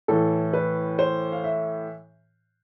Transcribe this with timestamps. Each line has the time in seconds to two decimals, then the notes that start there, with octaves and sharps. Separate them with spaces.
0.08 A2 E3 A4
0.53 B4
0.99 C5
1.32 F5
1.44 E5